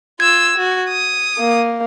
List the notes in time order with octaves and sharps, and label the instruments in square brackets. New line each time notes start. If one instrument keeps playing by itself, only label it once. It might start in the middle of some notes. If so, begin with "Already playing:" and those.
[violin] F4 E6 [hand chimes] G#6
[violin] F#4
D#6
[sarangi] A#3